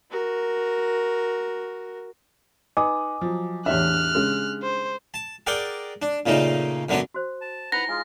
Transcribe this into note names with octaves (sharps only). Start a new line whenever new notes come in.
F#4 A#4
D#4 B4 D#5 G#5 D6 D#6
F3 F#3
E2 A2 D4 G4 E5 F6 F#6
C#3 G#3
C5
A5
G#4 A#4 D5 F#5 G5
D4
A#2 C#3 A3 A#3 D#4
F#2 D3 F#3 B3 C#4 D4
F#4 C5
A5
D#4 E4 B4 F#5 A#5 A#6
G#3 F4 G#5